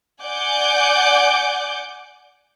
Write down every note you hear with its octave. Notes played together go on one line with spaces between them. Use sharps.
D5 F#5 G#5 D6 G6